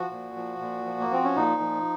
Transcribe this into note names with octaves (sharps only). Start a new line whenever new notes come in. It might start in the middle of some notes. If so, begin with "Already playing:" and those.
Already playing: F3 F#4
A#2
F3
A#2
F3
A#3
F3 C4
C#4
A#2 D#4
F3